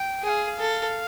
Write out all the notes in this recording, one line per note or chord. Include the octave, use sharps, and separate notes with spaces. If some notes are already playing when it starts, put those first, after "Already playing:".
Already playing: G5
G#4 F5 G5
A4